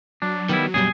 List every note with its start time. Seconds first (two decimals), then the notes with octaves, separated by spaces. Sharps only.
0.22 F#3 D4
0.49 D#3 G3 B3 E4
0.74 F#2 B2 G3 G#4